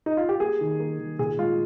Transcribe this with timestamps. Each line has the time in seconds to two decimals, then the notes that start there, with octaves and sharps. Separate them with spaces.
0.06 D#4
0.17 F4
0.29 G4
0.40 A#3 G#4
0.61 D#3
0.80 A#3
0.99 D#3
1.19 A#2 G#4
1.38 G#3 F4